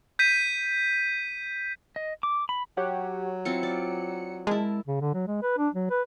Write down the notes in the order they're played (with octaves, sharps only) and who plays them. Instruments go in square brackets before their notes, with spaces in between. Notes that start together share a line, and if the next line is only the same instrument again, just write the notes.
[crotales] G6 B6 D#7
[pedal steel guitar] D#5
D6
B5
[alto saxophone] F#3 [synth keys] G4 C#5 F#5
[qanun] C4 E4 F4 [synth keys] C#7
[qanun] D5
[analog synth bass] G#3 [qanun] E4 A#4 [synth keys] A5
[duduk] C#3
D3
F#3
G#3
B4
D4
F#3
B4